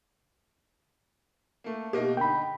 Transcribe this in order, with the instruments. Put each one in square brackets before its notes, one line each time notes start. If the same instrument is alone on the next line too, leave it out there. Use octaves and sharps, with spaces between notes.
[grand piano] A3 A#3
[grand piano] B2 A#3 D#4 [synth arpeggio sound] G4 A#4
[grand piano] D3 D#4 [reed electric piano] G5 B5